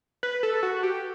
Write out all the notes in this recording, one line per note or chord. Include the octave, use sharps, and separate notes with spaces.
B4
A4
F#4
G4